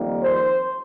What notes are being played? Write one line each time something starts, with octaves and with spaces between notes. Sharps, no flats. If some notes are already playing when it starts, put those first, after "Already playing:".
Already playing: F2 D#3 G3 A#3
C5